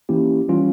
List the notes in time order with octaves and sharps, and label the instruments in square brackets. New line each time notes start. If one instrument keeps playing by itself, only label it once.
[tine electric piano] E3 A#3 C#4 E4 G4
E3 G3 C#4 F4